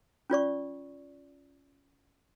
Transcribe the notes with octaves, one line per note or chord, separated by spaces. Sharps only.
C#4 F4 D5 C#6